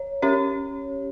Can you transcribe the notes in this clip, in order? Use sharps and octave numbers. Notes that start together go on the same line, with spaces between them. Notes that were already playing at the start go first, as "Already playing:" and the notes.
Already playing: C#5
C#4 G4 C#5